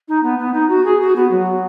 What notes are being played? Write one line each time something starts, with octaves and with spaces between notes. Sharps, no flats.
D#4
B3
B3
D#4
F#4
G#4
F#4
B3
F#3